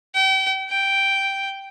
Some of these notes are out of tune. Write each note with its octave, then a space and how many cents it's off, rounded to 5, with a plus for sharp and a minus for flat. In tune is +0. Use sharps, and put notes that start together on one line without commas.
G5 -35
G5 -5